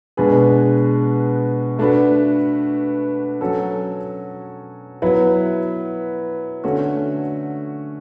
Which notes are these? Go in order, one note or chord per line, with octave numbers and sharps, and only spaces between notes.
B2 G#3 D4 G#4 B4
A3 D4 F#4 B4
F#3 C#4 F#4 A4
F#3 B3 E4 B4
D3 A3 C#4 F#4